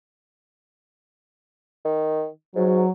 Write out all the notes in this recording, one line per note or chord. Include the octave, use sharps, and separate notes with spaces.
D#3
G#2 F#3